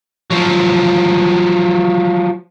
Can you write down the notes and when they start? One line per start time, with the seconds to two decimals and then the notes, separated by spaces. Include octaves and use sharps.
0.31 F3 F#3